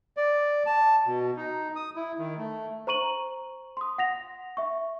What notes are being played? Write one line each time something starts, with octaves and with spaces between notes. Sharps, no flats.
D5
A5
B2
D#4
D#6
E4
D#3
A3
C5 A#5 C#6 D#7 F#7
C6 D#6
F#5 A#6 F7
E5 C#6